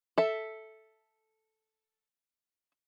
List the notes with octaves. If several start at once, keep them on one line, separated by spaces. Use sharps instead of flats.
A4 E5